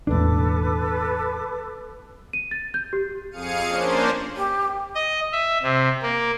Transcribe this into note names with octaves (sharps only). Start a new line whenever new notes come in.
E1 A1 D4 A4 B4 D6
D#7
A6
G6
G4
F2 G#4 F5 C#7 D#7
A#3 C#4 D4 C5
G4
D#5
E5
C3
A#3